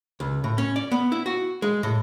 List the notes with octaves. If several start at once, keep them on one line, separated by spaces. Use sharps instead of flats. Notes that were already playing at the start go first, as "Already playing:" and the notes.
C#2
A2
C#4
D5
B3
E4
F#4
G#3
A2